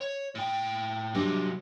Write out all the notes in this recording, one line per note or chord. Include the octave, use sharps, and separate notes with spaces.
C#5
A2 G5
C3 F#3 G3 D4